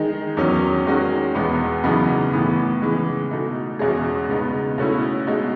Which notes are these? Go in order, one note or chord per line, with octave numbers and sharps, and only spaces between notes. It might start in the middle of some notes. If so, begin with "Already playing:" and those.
Already playing: D#3 G#3 D#4 G#4
E2 D#3 F#3 C#4
D#3 G#3 C#4 F#4
E2 B2 G#3 B3
F#2 C#3 E3 B3 D#4
A2 E3 B3
C#3 E3 G#3
B2 A3 D#4
E2 B2 G#3 C#4 G#4
C#3 G#3 B3 D#4
B2 A3 C#4 E4
B2 G#3 D#4